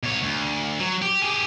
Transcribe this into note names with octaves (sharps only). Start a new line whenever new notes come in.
B2 C#5
D2
F#3
G4
G4 G#4